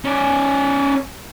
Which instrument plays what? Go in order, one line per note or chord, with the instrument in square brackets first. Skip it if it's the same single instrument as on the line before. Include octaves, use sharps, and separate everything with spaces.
[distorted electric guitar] C#4 D5